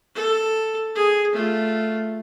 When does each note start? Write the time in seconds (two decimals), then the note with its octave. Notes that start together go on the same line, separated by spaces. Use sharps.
0.15 A4
0.96 G#4
1.33 A3 F4